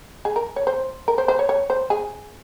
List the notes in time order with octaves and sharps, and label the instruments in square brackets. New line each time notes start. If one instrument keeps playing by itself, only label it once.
[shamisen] G#4
A#4
C#5
C5
A#4
C5
C5
C#5
C#5
C5
G#4